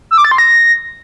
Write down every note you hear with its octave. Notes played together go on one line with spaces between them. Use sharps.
E6
D6
A6
C6
A#6